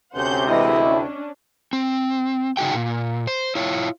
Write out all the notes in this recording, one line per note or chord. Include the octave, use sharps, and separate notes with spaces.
D2 C3 C#4 C5 F#5 G6
E3 G#3 E4 D#5
C#4 D4
C4
C#3 D#4 F#4 G#4 G5
A#2
C5
E4 F4 C#5